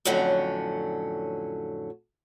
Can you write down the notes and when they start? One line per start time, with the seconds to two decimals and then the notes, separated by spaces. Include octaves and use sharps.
0.05 F2 A2 D3 F#3 C#4